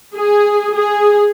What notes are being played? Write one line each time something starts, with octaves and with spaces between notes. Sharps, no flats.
G#4
G#4